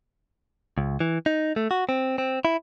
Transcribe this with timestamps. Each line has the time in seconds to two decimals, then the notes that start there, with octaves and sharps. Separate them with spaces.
0.78 C#2
1.00 E3
1.26 D#4
1.56 A3
1.71 F#4
1.89 C4
2.18 C4
2.45 E4